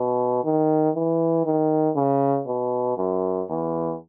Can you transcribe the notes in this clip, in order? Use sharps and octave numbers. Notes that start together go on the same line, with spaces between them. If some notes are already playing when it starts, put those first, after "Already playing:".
Already playing: B2
D#3
E3
D#3
C#3
B2
F#2
E2